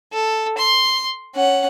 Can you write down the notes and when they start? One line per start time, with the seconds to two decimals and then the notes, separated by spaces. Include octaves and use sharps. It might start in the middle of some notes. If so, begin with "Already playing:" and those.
0.12 A4
0.58 C6
1.35 C#4 F#5